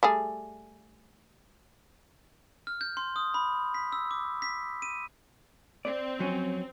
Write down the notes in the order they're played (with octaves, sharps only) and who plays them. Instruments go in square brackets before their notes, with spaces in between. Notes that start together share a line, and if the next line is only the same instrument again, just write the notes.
[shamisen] G3 A3 G#4
[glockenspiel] F6
G6
C6
D#6
B5
B6
E6
D6
B6
D#7
[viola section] C4 [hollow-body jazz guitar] D5
[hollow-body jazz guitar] F2 F#3 C#4